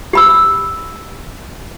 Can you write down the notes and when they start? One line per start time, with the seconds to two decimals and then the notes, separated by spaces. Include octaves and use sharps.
0.13 G4 B5 E6